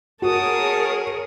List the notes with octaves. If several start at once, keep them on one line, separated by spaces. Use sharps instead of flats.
F#4 G#4 A#4 C#5 A5 D#6